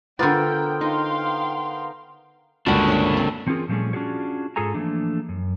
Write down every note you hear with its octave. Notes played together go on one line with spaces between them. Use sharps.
D3 B3 F4 A#4 C5 D5 G5
D#4 F5 G5 C6
C#2 G2 D3 A#3 D4 F#4 F#5
C#5 E5
C4
E3 C4 C#4 F4 G#4 A#4
A#2 F3 G3 A3 C#4 G#4
C#4 D4 F4 F#4 G#4 C#5
G#2 F4 G#4 A4 G#5 A#5
E3 F3 A3 A#3 D4
F#2